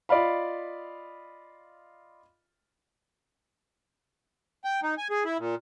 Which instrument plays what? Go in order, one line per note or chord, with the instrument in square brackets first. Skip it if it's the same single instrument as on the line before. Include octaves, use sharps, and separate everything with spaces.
[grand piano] F4 D5 D#5 F5 B5
[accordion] G5
D#4
G#5
G#4
E4
A#2